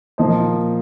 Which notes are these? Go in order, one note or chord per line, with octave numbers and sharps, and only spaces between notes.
A#2 F3 A#3 C5 D#5